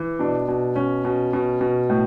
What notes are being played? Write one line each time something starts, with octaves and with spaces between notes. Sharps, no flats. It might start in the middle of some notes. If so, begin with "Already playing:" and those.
Already playing: E3
B2 D4
B2
B2 C#4
B2
B2
B2
A2